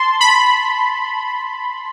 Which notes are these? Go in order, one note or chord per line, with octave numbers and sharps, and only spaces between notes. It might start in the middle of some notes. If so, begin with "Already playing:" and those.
Already playing: A5 C6
B5